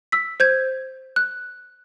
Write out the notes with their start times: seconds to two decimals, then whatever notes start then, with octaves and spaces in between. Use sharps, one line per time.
0.12 E6 B6
0.40 C5 G6 G#6
1.16 F#6